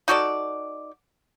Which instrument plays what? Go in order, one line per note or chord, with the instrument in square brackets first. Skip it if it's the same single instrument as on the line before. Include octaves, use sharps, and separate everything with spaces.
[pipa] D#4 F#4 A4 D5